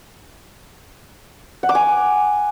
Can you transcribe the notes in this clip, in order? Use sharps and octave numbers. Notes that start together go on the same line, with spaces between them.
F#5
D6
G#5